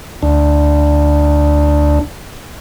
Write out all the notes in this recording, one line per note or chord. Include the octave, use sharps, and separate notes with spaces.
D2 D4